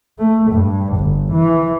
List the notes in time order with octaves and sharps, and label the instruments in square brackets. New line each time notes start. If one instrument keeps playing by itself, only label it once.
[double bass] A3
G2
G1
E3